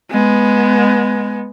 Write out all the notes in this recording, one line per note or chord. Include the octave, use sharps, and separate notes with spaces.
G#3 B3